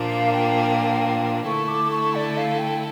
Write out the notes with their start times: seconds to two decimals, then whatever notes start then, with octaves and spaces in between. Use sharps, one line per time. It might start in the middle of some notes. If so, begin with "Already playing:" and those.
Already playing: A#2 F3 A#3 D4
0.10 F5
0.33 G5
1.46 D3 A3 E4 A4 C#6
1.68 D6
1.91 C#6
2.15 D5
2.37 F5
2.59 G5